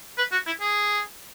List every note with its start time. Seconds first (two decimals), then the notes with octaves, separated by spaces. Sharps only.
0.18 B4
0.32 F#4
0.46 E4
0.61 G#4